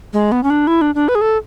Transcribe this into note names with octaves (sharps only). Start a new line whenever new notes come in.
G#3
B3
C#4
D4
E4
D4
D4
B4
G#4
A4